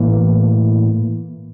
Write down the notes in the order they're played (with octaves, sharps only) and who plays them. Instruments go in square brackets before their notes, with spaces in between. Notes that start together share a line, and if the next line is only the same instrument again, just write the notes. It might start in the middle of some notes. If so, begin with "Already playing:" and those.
Already playing: [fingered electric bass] A2 E3 A#3